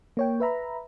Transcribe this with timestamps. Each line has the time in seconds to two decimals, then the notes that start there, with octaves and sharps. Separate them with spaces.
0.17 A#3 C#5 G5
0.40 B4 E5 A#5 B5